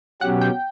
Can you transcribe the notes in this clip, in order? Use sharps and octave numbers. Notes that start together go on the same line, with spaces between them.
B2 F#3 C#4 G4 F#5
G5